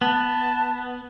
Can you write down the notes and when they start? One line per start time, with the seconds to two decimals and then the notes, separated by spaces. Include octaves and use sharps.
0.01 B3 A5